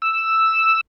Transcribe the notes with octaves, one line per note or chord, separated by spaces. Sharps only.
E6